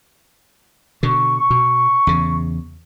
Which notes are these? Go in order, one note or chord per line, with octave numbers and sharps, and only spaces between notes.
B2 D3 C#6
B2
E2 C#3